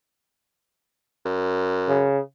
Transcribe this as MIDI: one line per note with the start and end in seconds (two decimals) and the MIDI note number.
1.26 2.07 42
1.88 2.19 49